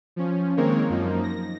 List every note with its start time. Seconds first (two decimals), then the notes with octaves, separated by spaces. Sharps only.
0.16 F3 C#4
0.57 D#3 G#3 A#3 C4 A#4 C#5
0.89 F#2 F3 A#3 D#4
1.23 A#6